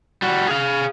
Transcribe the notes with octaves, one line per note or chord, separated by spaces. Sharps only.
G3 F#4
G#4 F5